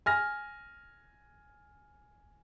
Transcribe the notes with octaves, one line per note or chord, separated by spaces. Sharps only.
G#5 F6 A#6